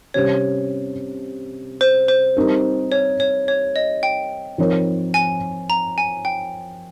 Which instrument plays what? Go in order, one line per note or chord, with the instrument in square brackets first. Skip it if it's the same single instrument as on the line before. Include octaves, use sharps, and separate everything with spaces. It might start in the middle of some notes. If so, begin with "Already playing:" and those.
[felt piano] C3 G3 C#4 G4 C5 [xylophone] C#5
[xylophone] C5
C5
[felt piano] G3 C4 D#4 A#4
[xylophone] C#5
C#5
C#5
D#5
G5
[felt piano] F3 C4 D#4 A#4 C#5
[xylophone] G#5
A#5
G#5
G5